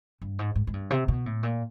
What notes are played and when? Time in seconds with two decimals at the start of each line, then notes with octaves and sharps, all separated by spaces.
0.22 G2
0.39 G#2
0.55 G#2
0.67 G#2
0.73 G2
0.91 C3
1.08 B2
1.26 A2
1.43 A#2